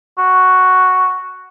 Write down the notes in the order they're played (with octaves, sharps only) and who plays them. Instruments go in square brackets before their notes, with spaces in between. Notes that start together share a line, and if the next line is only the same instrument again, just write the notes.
[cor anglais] F#4